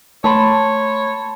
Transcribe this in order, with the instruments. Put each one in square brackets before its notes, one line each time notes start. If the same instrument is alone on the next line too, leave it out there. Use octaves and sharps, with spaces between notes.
[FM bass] A3 [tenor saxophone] C#5 [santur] A5 B5 C6